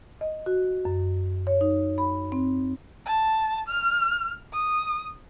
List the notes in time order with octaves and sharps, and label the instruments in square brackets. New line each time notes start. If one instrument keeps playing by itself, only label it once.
[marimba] D#5
F#4
F#2
C#5
D#4
B5
C4
[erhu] A5
F6
D#6